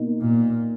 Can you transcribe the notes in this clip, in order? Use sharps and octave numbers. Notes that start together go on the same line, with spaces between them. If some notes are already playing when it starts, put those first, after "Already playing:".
Already playing: B2 A#3 D#4
A#2